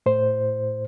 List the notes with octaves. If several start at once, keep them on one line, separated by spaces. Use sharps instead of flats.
A2 C5